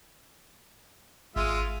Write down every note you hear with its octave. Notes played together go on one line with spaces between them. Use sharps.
G#1 G#3 F4 E5 D#7